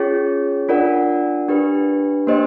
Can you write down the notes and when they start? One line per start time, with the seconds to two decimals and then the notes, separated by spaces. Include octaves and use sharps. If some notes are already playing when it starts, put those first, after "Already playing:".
Already playing: C#4 F4 G#4 C#5
0.68 D4 F4 A#4 D5 F#5
1.48 D4 G4 B4
2.27 A#3 D4 G4 C5 D#5